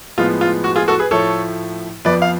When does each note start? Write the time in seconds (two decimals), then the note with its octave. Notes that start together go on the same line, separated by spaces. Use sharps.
0.18 A2 F3 G#3 B3 F4
0.41 F4
0.64 F#4
0.76 F4 G#4
0.88 F#4 A4
0.99 G#4 B4
1.11 A2 F3 A3 A4 C#5
2.05 F2 F3 B3 B4 D5
2.22 F5